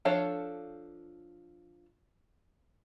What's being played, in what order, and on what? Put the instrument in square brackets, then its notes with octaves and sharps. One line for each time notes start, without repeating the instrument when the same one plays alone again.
[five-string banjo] F3 D4 A4 C#5 F5